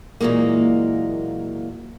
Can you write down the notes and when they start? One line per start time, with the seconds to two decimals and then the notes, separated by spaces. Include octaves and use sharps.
0.21 A#2 E3 F#3 G#3 A#3